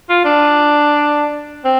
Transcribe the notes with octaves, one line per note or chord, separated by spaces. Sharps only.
F4
D4
C4